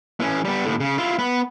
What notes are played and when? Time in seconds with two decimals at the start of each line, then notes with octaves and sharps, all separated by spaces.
0.20 E3 C#4
0.45 G3 B3
0.65 D#2 A2
0.80 C#3
0.98 E4 F4
1.19 B3